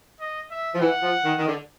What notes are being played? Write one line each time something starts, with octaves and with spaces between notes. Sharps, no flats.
D#5
E5
F3
E3 F#5
F3
D#3
D#3
D3